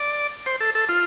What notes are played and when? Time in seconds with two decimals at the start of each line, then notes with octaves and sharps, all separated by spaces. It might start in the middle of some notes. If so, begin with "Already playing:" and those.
Already playing: D5
0.46 C5
0.60 A4
0.75 A4
0.89 F4